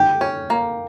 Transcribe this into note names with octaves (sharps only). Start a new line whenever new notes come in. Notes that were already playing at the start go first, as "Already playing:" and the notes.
Already playing: G4 G5
C#4
A#3